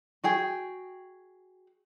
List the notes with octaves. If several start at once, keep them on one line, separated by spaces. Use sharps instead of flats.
F#4 G#4 G5